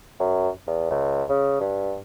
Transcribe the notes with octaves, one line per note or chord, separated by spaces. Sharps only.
F#2
E2
C#2
C#3
G2